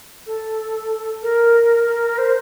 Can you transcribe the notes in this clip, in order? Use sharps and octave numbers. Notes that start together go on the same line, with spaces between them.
A4
A#4
A#4
C5